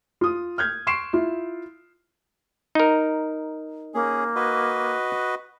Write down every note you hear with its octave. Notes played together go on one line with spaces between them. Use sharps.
F4 D#6
F6 G6 G#6
C6 C#6 C7 D7 E7
E4 F4
D#4 A#4
A#3 C#4 G#4
F#4 B4 D#5